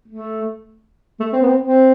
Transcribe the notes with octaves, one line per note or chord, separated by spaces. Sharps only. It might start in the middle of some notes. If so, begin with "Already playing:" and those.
A3
A3
C4
B3
C4
C4